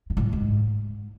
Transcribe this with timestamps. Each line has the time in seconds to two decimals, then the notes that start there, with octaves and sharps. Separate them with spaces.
0.10 G#2
0.17 A2
0.33 G#2